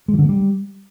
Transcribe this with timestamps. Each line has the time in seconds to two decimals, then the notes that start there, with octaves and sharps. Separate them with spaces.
0.08 G#3
0.14 E3
0.19 D3
0.24 G#3
0.29 G3